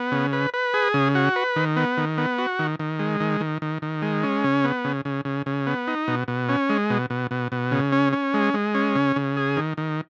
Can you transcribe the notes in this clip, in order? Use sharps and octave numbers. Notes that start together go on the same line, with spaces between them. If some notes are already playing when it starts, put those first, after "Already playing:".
Already playing: B3
C#3
B4
B4
G#4
C#3
F#4
B4
D#3
B3
D#3
B3
F#4
D#3
D#3
G#3
D#3
D#3
D#3
D#3
G#3
C#4
C#3
B3
C#3
C#3
C#3
C#3
B3
D#4
B2
B2
C#4
G#3
B2
B2
B2
B2
C#3
C#4
C#4
G#3
G#3
C#4
C#3
C#3
G#4
D#3
D#3